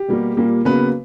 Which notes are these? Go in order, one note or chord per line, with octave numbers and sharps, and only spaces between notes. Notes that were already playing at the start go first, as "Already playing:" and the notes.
Already playing: G4
B2 G3 A#3
A#2 G3 A#3
C#3 F#3 A#3 B3 B4